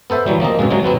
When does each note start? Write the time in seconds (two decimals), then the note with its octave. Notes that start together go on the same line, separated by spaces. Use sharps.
0.10 B3 A4 C5 E5
0.26 E3 F#3 G3
0.40 F3 A#3 C4 D#5
0.59 F#2 B2 G#3
0.71 C3 F#3 G#3
0.83 B2 F#3 B3 C4